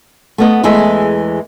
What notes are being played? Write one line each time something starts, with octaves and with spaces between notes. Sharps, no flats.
A3 B3 D#5
E2 E3 G#3 A3 G#4 E5